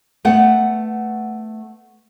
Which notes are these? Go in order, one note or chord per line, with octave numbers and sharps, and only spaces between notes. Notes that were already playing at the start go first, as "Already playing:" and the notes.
A3 B3 F#5